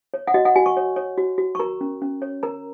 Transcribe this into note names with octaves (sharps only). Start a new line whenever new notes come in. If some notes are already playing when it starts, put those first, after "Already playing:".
C#5
F#5
F#4 D#5
F#5
F#4 G#5
C#6
C#5
C#5
F#4
F#4
C#6
A#4 A#5
C#4
C#4
C#5
A#4 A#5